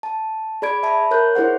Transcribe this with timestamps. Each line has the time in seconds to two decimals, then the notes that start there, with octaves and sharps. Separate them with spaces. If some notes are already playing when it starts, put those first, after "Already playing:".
0.03 A5
0.62 G#4 D5 B5 G#6 D7
0.83 E5 A5 B5
1.11 A#4 C#5 F#6 G6
1.35 E4 G#4 C5 F#5